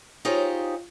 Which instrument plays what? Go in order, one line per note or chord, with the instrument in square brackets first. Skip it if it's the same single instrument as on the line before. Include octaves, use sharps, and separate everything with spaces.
[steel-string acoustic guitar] D#4 F4 G4 G#4 C5 C#5